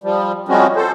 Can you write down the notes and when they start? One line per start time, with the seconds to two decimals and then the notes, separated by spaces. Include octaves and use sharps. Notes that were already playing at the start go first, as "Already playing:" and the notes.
0.04 F3 G3
0.48 F3 G3 G#3 C4 C#4 F#4
0.76 A4 C5